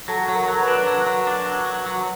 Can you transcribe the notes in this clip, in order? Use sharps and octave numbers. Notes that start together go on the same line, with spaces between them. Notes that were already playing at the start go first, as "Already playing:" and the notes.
F#3 A4 A5
F#3
A#4 A#5
F#3
B4 B5
D4
F#3
F#3
D4
F#3
F#3
F#3